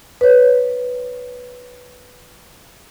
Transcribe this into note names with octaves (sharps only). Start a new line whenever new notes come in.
B4 C#5